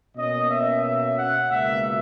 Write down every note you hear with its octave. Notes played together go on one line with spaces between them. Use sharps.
B2 A#3 C#4 D#5
E5
E5
F#5
C#2 B2 A#3 E5